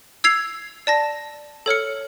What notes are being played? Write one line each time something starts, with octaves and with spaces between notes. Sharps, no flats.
E6 G#6 C7 F7
D5 A5 A#6
A4 C#5 F6 C#7